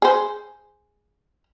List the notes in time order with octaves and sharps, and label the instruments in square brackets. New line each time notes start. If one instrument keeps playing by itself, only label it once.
[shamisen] G#4 C5